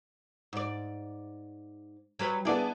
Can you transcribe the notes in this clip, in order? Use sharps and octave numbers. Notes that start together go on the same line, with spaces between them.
G#2 D5
F#3 G3 B4
B3 D4 E4 G#4 D5